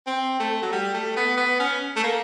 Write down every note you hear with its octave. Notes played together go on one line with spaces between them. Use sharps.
C4
A3
F#3
G3
A3
B3
B3
C#4
A3
A#3